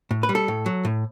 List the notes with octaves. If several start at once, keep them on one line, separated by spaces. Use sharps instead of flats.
A2
B4
G3
A4
A2
F#3
A2